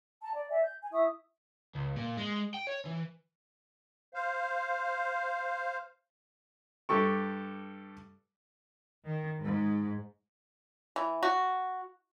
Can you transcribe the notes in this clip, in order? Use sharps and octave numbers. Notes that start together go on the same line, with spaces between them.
A5 A#5
D5
D5 E5 G#5
G6
G#5
E4 E5 C#6 D#6
C#2
A#2
G#3
G5
C#5
E3
C5 F5
G2 G4 A4 C#6
D#3
G#2
E3
F#4